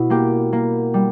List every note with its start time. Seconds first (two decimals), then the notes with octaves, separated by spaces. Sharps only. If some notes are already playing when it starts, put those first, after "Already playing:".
Already playing: B2 E4
0.10 A#3 G4
0.53 A#3
0.94 G3